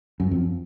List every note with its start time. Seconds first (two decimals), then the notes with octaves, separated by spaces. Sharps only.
0.20 F#2
0.31 F2